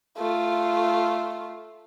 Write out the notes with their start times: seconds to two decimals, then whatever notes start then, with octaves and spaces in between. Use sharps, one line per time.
0.18 A3 F4